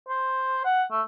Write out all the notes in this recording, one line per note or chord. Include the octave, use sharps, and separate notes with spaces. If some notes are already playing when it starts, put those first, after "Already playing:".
C5
F#5
A3